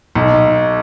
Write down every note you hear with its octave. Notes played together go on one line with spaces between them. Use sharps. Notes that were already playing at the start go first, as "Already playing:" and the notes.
B1